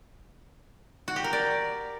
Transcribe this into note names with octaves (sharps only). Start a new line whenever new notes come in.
F#4
G4
A#4
D5